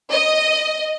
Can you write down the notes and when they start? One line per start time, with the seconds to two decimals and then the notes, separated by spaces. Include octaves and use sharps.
0.11 D#5